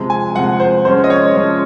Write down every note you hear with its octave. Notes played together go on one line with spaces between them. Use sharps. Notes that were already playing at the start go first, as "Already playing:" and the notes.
Already playing: C3 F3 G#3
G#5
C3 F3 G#3 F#5
C5
F3 G#3 C#4 C5
D#5
C#5
F3 G#3 C#4